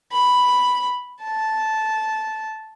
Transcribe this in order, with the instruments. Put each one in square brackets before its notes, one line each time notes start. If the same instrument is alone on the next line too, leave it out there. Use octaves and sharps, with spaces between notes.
[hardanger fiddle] B5
A5